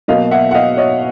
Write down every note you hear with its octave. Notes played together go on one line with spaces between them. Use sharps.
B2 F#3 A#3 D#5 F5
E5 F#5
F#5
D#5 F5
C#5 D#5